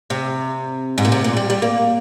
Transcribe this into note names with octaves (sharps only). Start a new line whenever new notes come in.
C3
G#2
A#2
C3
A#2
G3
G3
A#3